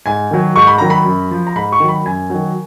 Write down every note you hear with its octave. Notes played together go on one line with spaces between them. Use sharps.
G#2 G#5
D#3 F#3
G#2 C#6
B5
D#3 F#3 A#5
B5
F#2
F3
A#5
G#2 B5
C#6
D#3 F#3
B5
F#2 G#5
D#3 F#3